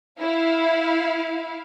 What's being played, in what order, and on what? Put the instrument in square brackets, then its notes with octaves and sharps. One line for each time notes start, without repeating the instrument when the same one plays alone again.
[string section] E4 F5